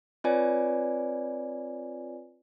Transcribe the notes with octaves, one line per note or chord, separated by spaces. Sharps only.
C4 F4 B4 C#5 D5 G#5